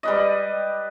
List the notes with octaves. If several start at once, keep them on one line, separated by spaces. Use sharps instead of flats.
G3 B4 D#5